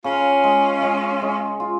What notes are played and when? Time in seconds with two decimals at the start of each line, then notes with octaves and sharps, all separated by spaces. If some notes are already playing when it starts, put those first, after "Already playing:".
0.04 C#3 C#4 F4
0.44 G#3
0.82 G#3
1.22 G#3
1.60 F4